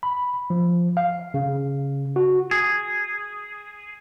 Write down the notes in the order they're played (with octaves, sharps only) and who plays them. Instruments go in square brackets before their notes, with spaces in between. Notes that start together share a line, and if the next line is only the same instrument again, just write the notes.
[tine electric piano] B5
F3
F5
C#3
F#4
[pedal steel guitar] G#4